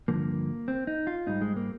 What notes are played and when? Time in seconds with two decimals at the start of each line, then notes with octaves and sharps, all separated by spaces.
0.08 G2 D3 F3 A#3
0.68 C4
0.87 D#4
1.07 F4
1.27 G#2 G3 D#4
1.41 G#3
1.56 A#3